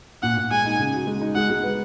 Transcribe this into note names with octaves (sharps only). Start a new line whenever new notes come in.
A#2 F#5
A#2
G#3 G#5
D#4
C#3
F#4
G#3
D#4
G#3 F#5
G#3
B3